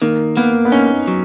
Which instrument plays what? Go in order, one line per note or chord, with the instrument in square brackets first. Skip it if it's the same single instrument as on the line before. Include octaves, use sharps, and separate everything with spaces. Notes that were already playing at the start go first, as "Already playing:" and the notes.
[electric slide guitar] D#3 [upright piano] A#3
[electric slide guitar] A#3 [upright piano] B3
[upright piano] B3
[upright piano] C#4 [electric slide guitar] D#4
[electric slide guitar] F#3